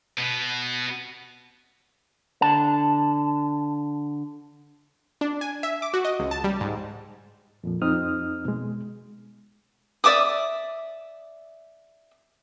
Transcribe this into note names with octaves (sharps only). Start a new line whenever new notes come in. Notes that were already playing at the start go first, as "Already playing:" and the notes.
B2 B3
D3 A5
D4
G#5
E5
D6
F#4
D#5
C#2
A5
G3
G#2
F2 A#2 F3
F2 C4 D#4 D#6 F6
B2 G#3
D5 E5 D6 D#6